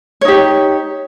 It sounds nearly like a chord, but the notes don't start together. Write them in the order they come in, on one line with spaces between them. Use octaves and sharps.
C#5 D#4 G4